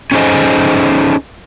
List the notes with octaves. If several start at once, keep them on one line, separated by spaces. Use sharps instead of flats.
C#4 D#4 G#4 A4 C5 D#5